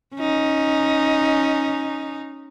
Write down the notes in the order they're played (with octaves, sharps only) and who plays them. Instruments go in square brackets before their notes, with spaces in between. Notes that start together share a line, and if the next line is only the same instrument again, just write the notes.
[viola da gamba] C#4 D#4